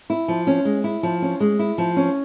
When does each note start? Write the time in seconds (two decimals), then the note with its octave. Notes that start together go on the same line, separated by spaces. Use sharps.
0.10 E4
0.28 F3
0.47 C#4
0.65 G#3
0.84 E4
1.03 F3
1.22 C#4
1.40 G#3
1.59 E4
1.78 F3
1.97 C#4